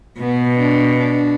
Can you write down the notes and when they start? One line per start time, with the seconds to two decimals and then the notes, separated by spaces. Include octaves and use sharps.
0.20 B2 B3
0.58 D4
0.98 D4